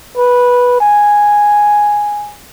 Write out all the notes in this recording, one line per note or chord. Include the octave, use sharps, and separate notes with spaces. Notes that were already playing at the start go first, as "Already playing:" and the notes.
B4
G#5